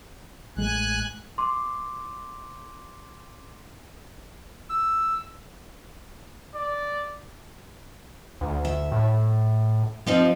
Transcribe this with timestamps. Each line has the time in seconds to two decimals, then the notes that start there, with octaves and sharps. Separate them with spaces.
0.57 A1 G#3 A3 G#5 F#6
1.38 C6 D6
4.70 E6
6.55 D5
8.41 D2
8.65 E5
8.92 A2
10.06 F3 C4 D#4 G4